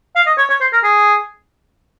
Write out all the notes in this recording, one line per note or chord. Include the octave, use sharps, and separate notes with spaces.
F5
D#5
C#5
C#5
C5
A#4
G#4